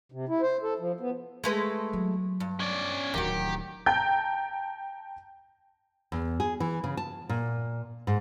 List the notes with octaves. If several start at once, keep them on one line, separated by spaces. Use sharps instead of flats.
C3
E4
C5
A4
F3
B3
G#3 A3 B4
F#3
G2
C#4 D5
D1 D#3 E3 F#4 G4
G5 A5 A#5 G6
E2
G#4
E3
C#3
A5
A#2
G#2